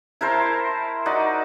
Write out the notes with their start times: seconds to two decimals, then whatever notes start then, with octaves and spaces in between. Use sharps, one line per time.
0.21 E4 A#4 C5 A5
1.06 D#4 F#4 D5